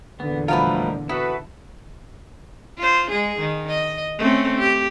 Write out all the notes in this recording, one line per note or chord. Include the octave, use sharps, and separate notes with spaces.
E2 A#2 D3 B3
D#3 F3 G3 A3 F4 F#4 A#4 B4
B3 E4 F#4 A4 B4
F4 C5
G#3 G#4
D#3
D#5
A3 C4 C#4
G4